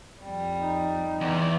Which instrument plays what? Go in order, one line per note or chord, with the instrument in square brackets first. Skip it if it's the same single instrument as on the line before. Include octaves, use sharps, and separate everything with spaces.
[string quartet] F2 G3
[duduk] D#4
[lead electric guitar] E2